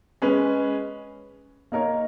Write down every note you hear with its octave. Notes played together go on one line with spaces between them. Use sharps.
G#3 C#4 G#4 B4
A#3 D#4 A#4 C#5